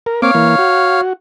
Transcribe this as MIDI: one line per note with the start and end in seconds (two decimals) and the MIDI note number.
0.06 0.21 70
0.22 0.31 58
0.22 0.31 60
0.22 1.01 73
0.22 1.01 77
0.22 0.31 86
0.35 0.56 52
0.35 0.56 58
0.59 1.13 66